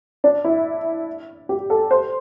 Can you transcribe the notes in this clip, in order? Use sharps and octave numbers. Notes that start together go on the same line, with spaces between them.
D4
E4
G4
A4
C5